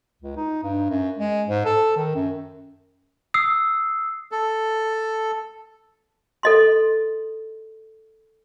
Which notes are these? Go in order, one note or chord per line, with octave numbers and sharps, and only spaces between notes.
C#2
D#4
G2
F#2
G#3
G#2
A4
D#3
F#2
D#6 E6 C7
A4
A4 D#5 C6